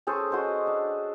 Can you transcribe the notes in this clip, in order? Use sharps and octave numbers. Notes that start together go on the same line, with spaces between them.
C#4 G#4 A4 C5
F#4 C5 D#5
D4